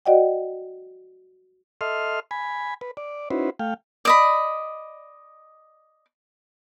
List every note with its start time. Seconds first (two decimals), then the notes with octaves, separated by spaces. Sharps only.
0.06 F#4 D5 D#5 F#5 G5
1.81 A4 D#5 E5 C6 F6
2.31 G#5 B5
2.81 B4
2.97 D5
3.31 C#4 D#4 E4 F#4 B4 C5
3.59 A3 F5 G5
4.05 D5 D#5 B5